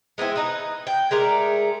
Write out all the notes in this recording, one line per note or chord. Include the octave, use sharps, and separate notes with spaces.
G#3 B3 C4 E4
D#4 B4
G5
G#3 A3 A#4 D5